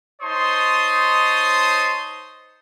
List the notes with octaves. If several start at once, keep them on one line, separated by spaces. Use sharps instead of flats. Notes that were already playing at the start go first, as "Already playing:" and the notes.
D#4 C5 C#5 A5 C6 D#6